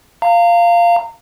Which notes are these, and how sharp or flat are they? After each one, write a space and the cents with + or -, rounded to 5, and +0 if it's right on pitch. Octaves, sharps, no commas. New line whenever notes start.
F5 -10 A#5 -30